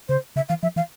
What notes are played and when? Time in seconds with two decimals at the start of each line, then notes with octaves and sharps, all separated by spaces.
0.09 C#3 C5
0.36 C#3 E5
0.49 E3 F5
0.63 F3 E5
0.76 E3 F5